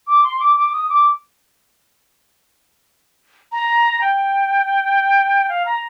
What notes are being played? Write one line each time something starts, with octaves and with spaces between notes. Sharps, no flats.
D6
C6
D6
D6
D#6
D6
A#5
G5
F5
A#5